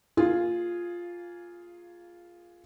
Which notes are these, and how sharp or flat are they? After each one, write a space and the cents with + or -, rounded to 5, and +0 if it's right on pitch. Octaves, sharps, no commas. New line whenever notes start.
A#3 -20 F4 +0 G#4 +0